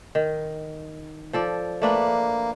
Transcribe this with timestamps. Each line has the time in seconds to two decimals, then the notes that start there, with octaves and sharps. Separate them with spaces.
0.15 D#3
1.33 F3 A4 D5
1.82 A3 A#3 D4 B4